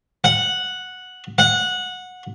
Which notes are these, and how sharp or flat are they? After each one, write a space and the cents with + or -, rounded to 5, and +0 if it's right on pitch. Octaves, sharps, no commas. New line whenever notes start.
F#5 -5
F#5 -15